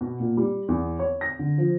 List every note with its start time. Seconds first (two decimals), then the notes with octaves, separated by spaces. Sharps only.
0.01 B2
0.20 A#2
0.37 G3
0.68 E2
0.99 C#5
1.21 A#6
1.39 D3
1.58 F3